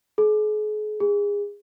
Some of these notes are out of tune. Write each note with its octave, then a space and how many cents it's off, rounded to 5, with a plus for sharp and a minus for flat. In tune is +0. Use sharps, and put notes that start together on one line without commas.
G#4 +40
G#4 -25